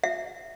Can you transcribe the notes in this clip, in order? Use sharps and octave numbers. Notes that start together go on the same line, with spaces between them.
E5